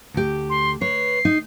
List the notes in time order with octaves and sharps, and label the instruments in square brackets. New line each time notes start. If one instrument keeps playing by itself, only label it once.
[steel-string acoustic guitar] D2 G4
[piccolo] C6
[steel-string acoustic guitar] B4 C#5 [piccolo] C7
[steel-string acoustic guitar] D#4